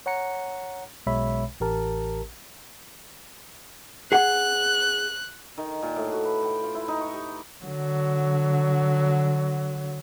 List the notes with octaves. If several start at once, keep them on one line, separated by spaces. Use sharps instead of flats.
C#5 F#5 A#5 C#7
B1 B2 G#3 C#5 E5 B5
A1 G4 A#4 A5
G#4 F#5 F#6
D#3
A#2
A2
F#4
B4
G5
F4
E4
D#4
C#6
G4
D6
D3 F#3